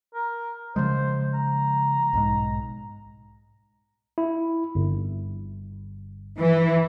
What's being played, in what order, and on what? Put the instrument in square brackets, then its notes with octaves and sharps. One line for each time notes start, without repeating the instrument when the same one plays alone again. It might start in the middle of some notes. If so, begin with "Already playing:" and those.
[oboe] A#4
[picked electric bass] C#3 F3 G#3 [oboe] C5
[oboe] A#5
[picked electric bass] B1 G#2 G#3
[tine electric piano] E4
G1
[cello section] E3